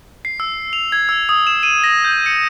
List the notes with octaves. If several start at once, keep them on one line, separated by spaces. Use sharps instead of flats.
C7
E6
F7
G#6
E6
D#6
E7
D#7
A#6
G6
C#7